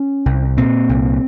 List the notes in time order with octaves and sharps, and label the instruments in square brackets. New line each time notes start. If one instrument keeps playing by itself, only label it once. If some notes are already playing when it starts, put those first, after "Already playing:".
Already playing: [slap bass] C#4
C2
A#2 C4
C2